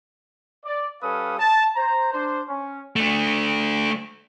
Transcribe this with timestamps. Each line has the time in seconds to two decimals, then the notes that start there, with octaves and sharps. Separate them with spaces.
0.65 D5
1.02 G3 C#4 A4 B4 F5 D#6
1.39 A5
1.76 C5 A#5
2.13 D4 C5
2.48 C#4
2.96 A3 D4